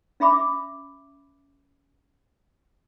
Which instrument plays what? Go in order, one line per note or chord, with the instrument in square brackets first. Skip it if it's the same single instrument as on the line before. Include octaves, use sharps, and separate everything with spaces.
[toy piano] C#4 E5 B5 D6